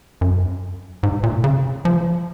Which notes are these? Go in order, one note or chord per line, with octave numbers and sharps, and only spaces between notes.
F#2
G#2
A#2
C#3
F3